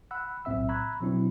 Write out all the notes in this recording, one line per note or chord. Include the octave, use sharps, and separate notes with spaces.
F#5 B5 E6 F#6
B1 A2 C4 E5 E6
A#5 B5 C#6 E6 F#6 G#6
B2 F3 F#3 C4 D4 E4